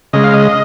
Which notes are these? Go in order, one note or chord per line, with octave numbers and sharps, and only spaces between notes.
C#3 G#3 D#5
F5
D#5